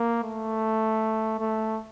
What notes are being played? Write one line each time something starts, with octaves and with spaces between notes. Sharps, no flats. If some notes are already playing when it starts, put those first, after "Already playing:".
Already playing: A#3
A3
A3